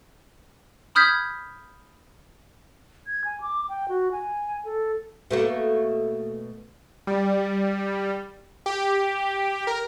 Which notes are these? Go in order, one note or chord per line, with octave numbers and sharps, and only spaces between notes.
B5 D#6 F6 G6 G#6 B6
G#6
G#5
D6
G5
F#4
G#5
A4
B2 A3 A#3
G3
G4
A#4